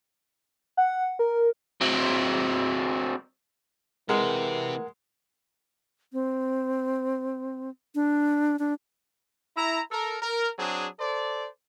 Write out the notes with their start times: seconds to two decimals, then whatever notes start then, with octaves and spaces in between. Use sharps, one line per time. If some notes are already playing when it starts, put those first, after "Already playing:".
0.77 F#5
1.19 A#4
1.81 F#3 C4
4.09 C3 E3 G#3 G4 A#4 F#5
6.13 C4
7.95 D4
8.59 D4
9.57 E4 A#5
9.91 A4 A#4
10.22 A#4
10.59 F#3 C4 D4 G#4
11.00 A4 C5 D5